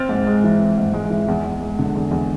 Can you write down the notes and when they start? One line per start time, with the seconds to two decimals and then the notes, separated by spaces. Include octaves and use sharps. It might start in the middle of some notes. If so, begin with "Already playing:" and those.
Already playing: C4 F6 A6
0.09 G#2
0.27 G#3
0.44 E3
0.60 C4
0.78 G#2
0.94 G#3
1.10 E3
1.28 E2
1.44 E2
1.61 G#3
1.79 D3
1.95 E2
2.11 E2